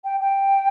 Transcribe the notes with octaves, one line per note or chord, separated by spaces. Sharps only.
G5
G5